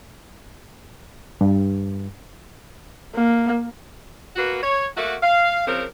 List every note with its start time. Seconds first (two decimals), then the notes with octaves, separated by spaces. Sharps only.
1.41 G2
3.15 A#3
4.36 A#3 B3 F#4
4.62 C#5
4.97 A3 A#3 F#4
5.23 F5
5.66 C#3 F3 C4 A#4